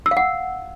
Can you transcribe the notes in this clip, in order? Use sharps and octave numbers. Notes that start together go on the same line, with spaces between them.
E6
F5
F#5